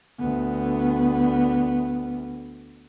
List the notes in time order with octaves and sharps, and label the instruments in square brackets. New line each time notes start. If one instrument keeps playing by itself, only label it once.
[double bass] D2 B3